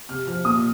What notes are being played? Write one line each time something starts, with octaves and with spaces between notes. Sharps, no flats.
C3 F6
F3 F6
A#2 D#6